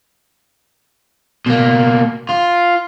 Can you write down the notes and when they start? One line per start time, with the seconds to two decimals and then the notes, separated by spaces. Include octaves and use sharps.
1.46 B2 A#3
2.29 F4